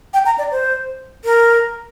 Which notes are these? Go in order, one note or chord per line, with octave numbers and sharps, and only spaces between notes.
G5
A#5
D5
C5
A#4